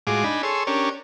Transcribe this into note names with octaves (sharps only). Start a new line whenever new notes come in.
A2 G#3 F4 F#4 G#4 D6
D4 D#4 G#5 B5
G#4 A4 C#5 C6 E6
C#4 D4 G4 A#4 C#5